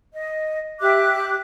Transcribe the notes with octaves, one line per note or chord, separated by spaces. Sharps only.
D#5
G4 E5 D6 F#6